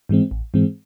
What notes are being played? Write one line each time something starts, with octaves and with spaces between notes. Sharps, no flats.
G#2 E3 G#3 C4
A1
G#2 E3 G#3 C4